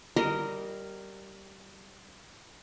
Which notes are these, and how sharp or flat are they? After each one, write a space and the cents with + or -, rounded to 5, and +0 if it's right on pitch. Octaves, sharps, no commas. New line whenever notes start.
G3 -15 A#4 -10 D#5 +10